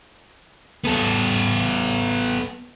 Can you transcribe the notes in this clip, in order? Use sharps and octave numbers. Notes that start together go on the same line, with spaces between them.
B3 A4